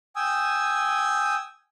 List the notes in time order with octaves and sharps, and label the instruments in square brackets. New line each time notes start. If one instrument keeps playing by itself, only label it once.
[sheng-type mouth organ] G5 G#5 D#6 E6